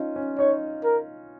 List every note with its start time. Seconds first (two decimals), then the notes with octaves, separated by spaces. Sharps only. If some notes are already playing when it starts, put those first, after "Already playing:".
Already playing: C#4 D#4 F4
0.16 C#4
0.38 D#4 C#5
0.84 A#4